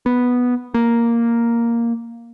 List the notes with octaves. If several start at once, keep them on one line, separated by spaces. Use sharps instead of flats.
B3
A#3